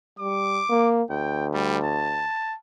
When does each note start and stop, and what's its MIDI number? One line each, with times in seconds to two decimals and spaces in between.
0.19 0.61 55
0.19 0.94 86
0.69 1.03 58
1.10 2.27 38
1.10 1.47 79
1.54 1.78 55
1.84 2.56 81